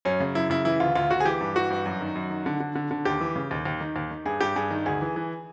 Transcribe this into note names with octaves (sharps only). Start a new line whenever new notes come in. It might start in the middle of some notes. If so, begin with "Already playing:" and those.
F#2 C#4
C#3
F#2 E4
C#3 E4
E3 E4
D2 F4
D2 F4
D2 F#4
G#4
E3 G4
G2
E3 F#4
G2
F#2
D#3
F#2
D#3
D3
D3
D3
D3
D#2 G4
E3
C#3
D#2
D#2
D#3
D#2
D#3
G2 G#4
G2 G4
G2 G#4
D#3
D2 G#4
E3
E3